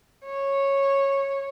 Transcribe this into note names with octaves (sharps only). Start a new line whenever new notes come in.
C#5